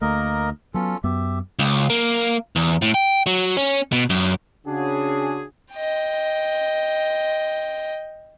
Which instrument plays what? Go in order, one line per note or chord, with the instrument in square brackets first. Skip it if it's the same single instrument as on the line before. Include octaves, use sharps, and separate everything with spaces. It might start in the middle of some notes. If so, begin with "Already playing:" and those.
[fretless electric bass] D2 A3 [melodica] A#3 A#4 D#5
[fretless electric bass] F#3 B3 [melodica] C#4 F4 A4
[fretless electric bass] F#2 B3 [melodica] G4 E5
[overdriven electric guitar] C#2
A#3
E2
A2
G5
F#3
C#4
B2
F#2
[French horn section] C#3 [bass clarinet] D4 [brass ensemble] F#4 G#4
[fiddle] D#5 G5